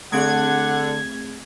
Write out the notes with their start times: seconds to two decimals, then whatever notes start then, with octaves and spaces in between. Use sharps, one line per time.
0.12 D3 A3 C4 G#4 F#5 G#6